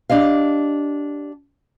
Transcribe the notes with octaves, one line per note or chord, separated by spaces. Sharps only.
D4 G4 D#5 F5